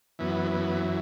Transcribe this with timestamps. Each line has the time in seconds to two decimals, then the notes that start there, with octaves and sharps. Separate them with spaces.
0.19 F#2 E3 B3
0.51 B3